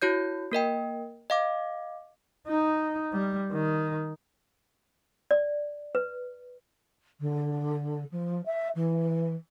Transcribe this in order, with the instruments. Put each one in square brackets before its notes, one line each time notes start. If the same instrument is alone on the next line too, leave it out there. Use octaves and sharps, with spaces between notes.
[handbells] E4 F#4 C#5 G6
A#3 A#4 D#5 G5
D#5 F5 D6
[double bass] D#4
G3
D#3
[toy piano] D5
B4
[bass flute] D3
F3
E5
E3